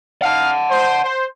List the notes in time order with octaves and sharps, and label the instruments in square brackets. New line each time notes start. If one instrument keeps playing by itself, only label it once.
[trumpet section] D#4 F5 [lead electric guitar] F#5 A5
[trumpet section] C5
C5